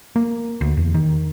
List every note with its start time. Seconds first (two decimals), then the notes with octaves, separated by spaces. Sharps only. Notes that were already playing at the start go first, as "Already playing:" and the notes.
0.16 A#3
0.61 D2
0.77 E2
0.94 D#3